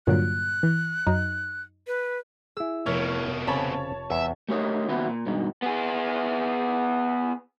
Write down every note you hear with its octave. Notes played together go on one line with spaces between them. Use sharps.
G2 A#2 D3 F#3 F#5 F#6 D7
E3
F#2 F#3 D#4
B4
E4 G#4 E6
F1 B2 A3 A#4 C#5 F6
C#3 C4 C#5 A5 B5
E2 E5
A3 G4 A#4 C#5 D#5
D#2 B3 C4 E4 F#4 B4
A#2
G2 B2 D#3 G#3
B3 G#4